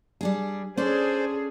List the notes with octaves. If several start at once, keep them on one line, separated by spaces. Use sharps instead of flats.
G3 D4 G#4
C#4 D4 G#4 A4 C5 D5